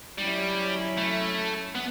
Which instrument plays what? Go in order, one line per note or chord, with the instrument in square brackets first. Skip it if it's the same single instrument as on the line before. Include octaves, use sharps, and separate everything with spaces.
[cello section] F#3 C#4 E4 [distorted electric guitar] G3
[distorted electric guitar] A3
B3